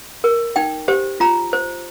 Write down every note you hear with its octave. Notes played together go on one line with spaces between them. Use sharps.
A#4
D#4 G5
G4 C5
F4 A#5
C5